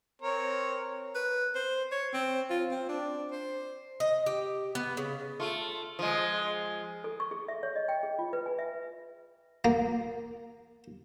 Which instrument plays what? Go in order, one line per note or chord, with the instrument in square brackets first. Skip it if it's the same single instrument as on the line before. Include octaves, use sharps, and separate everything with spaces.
[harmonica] C4 A#4 C#5
[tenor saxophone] B4
C5
C#5
C4
F4
C4
D4
C5
[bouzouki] D#5
G4
B3
C#3
[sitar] A3 F4
F3 G#3
[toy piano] A4
C#6
G#4
E5
C#5
D#5
G5
G#4
F4
B4
G#5
E5
[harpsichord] A#3